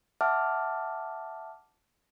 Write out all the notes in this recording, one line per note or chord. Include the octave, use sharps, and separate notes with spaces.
E5 F#5 A5 D6 F6